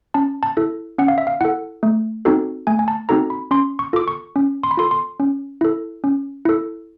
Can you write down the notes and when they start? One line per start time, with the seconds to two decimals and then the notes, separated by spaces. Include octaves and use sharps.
0.14 C#4 A5
0.43 A5
0.57 E4 A4
0.98 C#4 F#5
1.08 F5
1.18 E5
1.27 F5
1.41 E4 A4 F#5
1.83 A3
2.25 C4 D#4 F#4 A4
2.67 A3 G#5
2.79 G#5
2.88 A5
3.09 C4 D#4 F#4 A4 A#5
3.30 B5
3.51 C#4 C6
3.79 C#6
3.93 F4 A4 D6
4.08 C#6
4.36 C#4
4.63 C6
4.71 B5
4.77 F4 A4 C6
4.91 C6
5.20 C#4
5.61 E4 A4
6.04 C#4
6.45 E4 A4